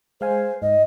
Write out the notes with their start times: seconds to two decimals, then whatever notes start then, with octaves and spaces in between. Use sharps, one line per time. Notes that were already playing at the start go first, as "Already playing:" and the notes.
0.21 G#3 C5 F5 G#5
0.62 G#2 D#5